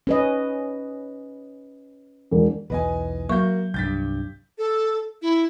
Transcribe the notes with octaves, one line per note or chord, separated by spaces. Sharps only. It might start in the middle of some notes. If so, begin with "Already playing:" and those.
C#4 B4 D#5
E1
B1 E2 B4 D#5 G#5
F#3 A#3 F#4 C#6 G6
C2 G2 G6 A6 B6
A4
E4